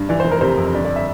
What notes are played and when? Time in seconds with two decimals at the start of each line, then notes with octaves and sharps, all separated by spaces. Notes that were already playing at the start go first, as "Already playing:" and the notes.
Already playing: G2
0.09 E3 D5
0.20 C5
0.25 F1
0.31 A#4
0.41 C3 C5
0.58 F2
0.74 G1 D5
0.85 D5
0.96 E5